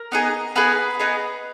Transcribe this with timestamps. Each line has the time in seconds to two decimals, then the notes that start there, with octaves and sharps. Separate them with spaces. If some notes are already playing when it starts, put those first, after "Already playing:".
Already playing: A#4
0.12 B3 D#4 G#4
0.56 B3 D#4 G#4 B4
1.00 B3 D#4 G#4